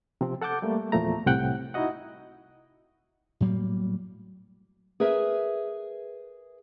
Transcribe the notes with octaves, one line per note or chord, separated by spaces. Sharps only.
C3 F3 C4
A4 F#5 A5 D6 G6
G3 A3 A#3
E2 A#2 F3 A3 A#5
C2 A2 C3 F#5 G5 F#6
D#4 E4 F#4 D#5 F#5
A2 F#3 G3 A#3
G#4 A#4 B4 E5